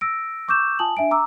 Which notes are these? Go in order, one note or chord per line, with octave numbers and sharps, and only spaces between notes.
E6 A#6 D7
C#6 D6 E6 G6 E7
F4 G#5 A5 D#6 F#7
D4 E5 G#5 D7
A#5 D6 E6